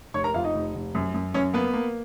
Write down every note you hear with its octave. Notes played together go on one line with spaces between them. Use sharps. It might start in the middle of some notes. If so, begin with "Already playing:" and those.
F1 C#5 C#6
A#4 A#5
F2 F4 F5
D#4 D#5
F1
F1
F#2
F#2
F#2 C#4 C#5
A#3 B3 B4
A#3